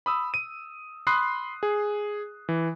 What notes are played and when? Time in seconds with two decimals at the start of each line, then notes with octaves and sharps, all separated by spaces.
0.06 B5 D#6 E6
0.34 D#7
1.07 B5 C6 D#6 F#6 C7
1.63 G#4
2.49 E3